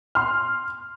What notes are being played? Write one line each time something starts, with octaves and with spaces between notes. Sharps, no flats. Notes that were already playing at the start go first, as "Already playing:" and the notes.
C6 F6